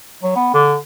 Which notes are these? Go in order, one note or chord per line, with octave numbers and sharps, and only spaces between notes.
F#3
B3
D3